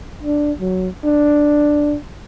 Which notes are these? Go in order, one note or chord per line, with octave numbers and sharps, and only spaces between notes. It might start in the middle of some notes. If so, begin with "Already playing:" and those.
D4
F#3
D4